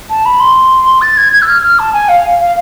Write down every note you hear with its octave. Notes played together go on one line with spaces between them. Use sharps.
A5
B5
C6
A6
G#6
G#6
E6
F6
F6
A5
G#5
F5
F5